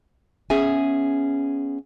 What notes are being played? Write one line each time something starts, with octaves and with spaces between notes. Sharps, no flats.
B3 C#4 G#4 E5 G#5